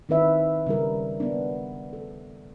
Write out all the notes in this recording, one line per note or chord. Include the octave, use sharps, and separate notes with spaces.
D#3 C4 B4 E5
C#3 G3 A#4
B3 D4
A4